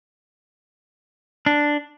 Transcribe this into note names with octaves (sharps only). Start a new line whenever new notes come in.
D4